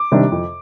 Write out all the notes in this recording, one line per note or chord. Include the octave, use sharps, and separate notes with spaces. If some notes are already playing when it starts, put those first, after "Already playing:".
Already playing: D6
C3 D#3 G3 D4
F2